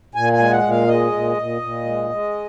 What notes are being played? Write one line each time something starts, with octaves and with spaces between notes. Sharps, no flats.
A#2 G#5
G#5
G#3
F#5
A#2
F5
G#3 D#5
A#2
A#2
A#2
G#3
G#3